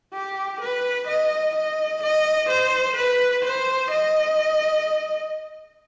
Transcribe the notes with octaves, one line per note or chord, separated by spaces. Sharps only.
G4
B4
D#5
D#5
D#5
C5
B4
C5
D#5